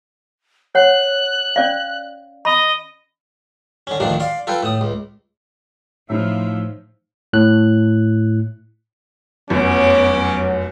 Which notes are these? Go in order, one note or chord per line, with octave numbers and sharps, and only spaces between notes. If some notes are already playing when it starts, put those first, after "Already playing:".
C#5 F#5 F#6
C#4 D5 F5
D#5 B5
D3 C#4
D2 A#2 D#3 F3 D4
D5 F5 C6
F4 A4 B4 G5
A2 D#6
C#2
A2 F3 D#4 E5 F6
A2 F#6
F1 F#2 F#3 B3 C#4 D6